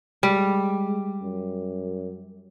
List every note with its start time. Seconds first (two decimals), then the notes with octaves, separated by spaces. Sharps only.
0.23 G3 G#3
1.22 F#2